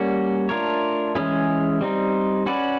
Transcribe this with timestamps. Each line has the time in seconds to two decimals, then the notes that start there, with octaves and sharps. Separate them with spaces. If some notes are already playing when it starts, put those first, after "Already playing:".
Already playing: G3 A#3 C#4 F#4
0.49 A3 D4 F4 A#4 C#5
1.15 E3 G#3 C#4 E4 G#4
1.81 G3 C4 D#4
2.46 C#4 F#4 B4 D5